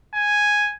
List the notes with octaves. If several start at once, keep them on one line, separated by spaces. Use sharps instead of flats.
G#5